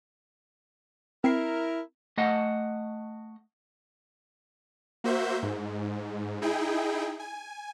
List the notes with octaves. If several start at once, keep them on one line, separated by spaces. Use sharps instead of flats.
C4 E4 A#4 C7
A3 D#5 F#5
A#3 F#4 C5 E5 G6
G#2
D#4 E4 G#4 G5
G#5